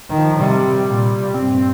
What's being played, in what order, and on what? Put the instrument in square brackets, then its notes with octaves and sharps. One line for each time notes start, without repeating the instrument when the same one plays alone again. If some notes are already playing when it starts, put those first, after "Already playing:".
[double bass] D#3
[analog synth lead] F3
[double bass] C3 [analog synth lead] G3
[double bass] A#2
[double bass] G2 [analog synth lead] C4